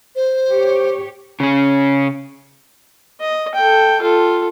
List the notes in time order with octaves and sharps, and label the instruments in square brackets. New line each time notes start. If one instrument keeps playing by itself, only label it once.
[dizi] C5
[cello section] G4 C#5
[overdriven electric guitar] C#3 C#4
[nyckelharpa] D#5
A4 G5
F4 A4